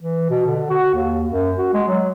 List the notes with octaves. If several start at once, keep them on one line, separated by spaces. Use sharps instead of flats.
E3
B2
D3
F#4
D#2
F#2
F#4
G#3
F#3